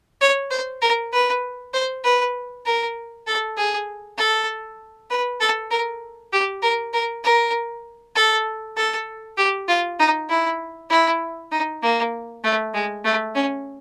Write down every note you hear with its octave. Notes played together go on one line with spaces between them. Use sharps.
C#5
C5
A#4
B4
C5
B4
A#4
A4
G#4
A4
B4
A4
A#4
G4
A#4
A#4
A#4
A4
A4
G4
F4
D#4
E4
E4
D#4
A#3
A3
G#3
A3
C#4